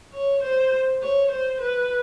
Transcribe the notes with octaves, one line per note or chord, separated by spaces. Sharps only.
C#5
C5
C#5
C5
B4